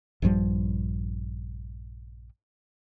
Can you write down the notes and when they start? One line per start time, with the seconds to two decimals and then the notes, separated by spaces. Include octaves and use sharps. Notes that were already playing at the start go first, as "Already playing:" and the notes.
0.22 A#1 G2 F3 G3